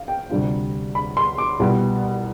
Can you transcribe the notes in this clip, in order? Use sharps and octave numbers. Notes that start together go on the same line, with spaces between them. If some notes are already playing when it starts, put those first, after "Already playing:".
Already playing: F5
G5
D2 C3 G3 D4 F4
B5
C6
D6
C2 B2 G3 B3 F4